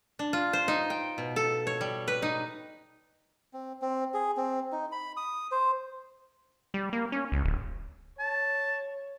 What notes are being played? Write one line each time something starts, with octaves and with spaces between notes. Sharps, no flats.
D4
F4
C5
D#4
G5
B2
A4
C#5
G3
B4
D#4
C4
C4
G#4
C4
D#4
B5
D#6
C5
G3
A#3
C#4
C#2
D1
C#5 A5